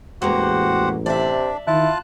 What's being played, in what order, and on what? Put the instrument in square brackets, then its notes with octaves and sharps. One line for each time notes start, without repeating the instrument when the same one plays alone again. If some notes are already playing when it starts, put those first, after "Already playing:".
[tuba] A1 [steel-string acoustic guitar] E2 G#3 A#3 [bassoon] F#4 [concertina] G4 C5 F#5
[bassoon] C3 [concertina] D4 [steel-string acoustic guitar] D5 E5
[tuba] D#3 [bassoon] E4 [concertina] F4 A5 F#6